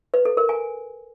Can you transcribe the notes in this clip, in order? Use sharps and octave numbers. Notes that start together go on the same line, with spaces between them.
B4
A4
A#4
G#5